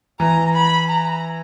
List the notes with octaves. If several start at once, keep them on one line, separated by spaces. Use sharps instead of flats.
E3 A#5
B5
A#5